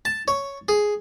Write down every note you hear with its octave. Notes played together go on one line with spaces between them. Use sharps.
A5
C#5
G#4